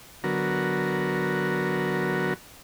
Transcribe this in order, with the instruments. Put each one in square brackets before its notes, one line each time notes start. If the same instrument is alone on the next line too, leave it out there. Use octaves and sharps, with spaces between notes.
[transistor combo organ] D3 F#3 B3 F#4 A#4